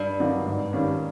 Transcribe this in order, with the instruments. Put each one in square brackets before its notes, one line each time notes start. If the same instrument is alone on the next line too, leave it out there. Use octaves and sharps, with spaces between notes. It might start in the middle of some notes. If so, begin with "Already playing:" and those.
Already playing: [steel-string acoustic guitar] G2
[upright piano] D3 F#3 A#3 D#4
G#2
D#3 G3 A#3 C#4